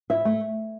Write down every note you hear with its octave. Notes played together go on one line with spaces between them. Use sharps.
E4 E5
A3